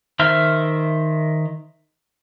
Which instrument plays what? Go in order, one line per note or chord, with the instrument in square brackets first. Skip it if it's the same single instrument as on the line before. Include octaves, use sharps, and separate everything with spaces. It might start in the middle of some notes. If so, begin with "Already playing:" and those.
[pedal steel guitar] D#3 C5 E5 F6